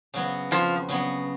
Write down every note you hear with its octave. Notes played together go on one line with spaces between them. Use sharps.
C#3 F#3 B3
F2 F3
C#3 F#3 B3